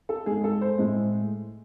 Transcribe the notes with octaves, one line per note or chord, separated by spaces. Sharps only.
A4
G#2 G#3 G#4
A4
C5
A2 G#3